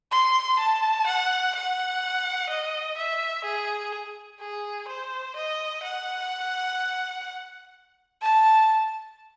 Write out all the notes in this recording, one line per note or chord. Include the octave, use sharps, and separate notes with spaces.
C6
A5
F#5
F#5
D#5
E5
G#4
G#4
C5
D#5
F#5
A5